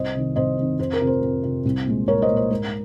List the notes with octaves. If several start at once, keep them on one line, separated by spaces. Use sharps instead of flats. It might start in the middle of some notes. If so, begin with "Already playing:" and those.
Already playing: C2 C5 D#5
C3 D#3
C2 C5 D#5
C3 D#3
F2 C5
A#4
C3 F3
C5
F2
C3 F3
C2
A#2 G#3
C2 A#4 C#5
C5 D#5
A#2 G#3
C5
G#2 A#4